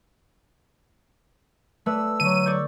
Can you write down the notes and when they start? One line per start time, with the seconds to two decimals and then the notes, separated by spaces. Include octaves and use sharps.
1.86 A3 B4 D5 E6
2.20 D3 F#3 D#7
2.46 D5 C#6 G6